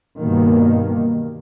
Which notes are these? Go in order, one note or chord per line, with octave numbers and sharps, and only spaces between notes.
G2 B2 D#3 A#3